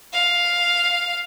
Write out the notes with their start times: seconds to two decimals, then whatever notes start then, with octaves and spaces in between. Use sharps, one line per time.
0.13 F5